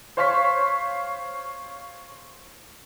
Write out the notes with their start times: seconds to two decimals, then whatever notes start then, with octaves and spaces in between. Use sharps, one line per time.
0.17 C5 C#5 F5 C6 C#6 B6